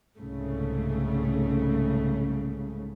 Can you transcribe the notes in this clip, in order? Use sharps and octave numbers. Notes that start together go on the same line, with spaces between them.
C2 G#2 C#3 A3